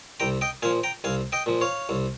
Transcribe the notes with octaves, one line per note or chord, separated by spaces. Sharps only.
C2 G5 A#5
D#5 G5
A#2 F3 F5 G#5
G5 A#5
C2 F5 G#5
D#5 G5
A#2 F3
C#5 F5
C2